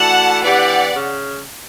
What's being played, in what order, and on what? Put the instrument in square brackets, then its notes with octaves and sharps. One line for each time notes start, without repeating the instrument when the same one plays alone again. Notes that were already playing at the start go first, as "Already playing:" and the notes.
Already playing: [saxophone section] E3 A3 D4 F#4 [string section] F#5 A5
[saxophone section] E3 B3 D4 G4 [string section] D5 F#5
[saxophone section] C#3